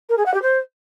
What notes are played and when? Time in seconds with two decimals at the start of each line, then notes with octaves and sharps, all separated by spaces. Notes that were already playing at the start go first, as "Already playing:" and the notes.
0.09 A#4
0.17 G#4
0.25 F#5
0.34 G4
0.42 C5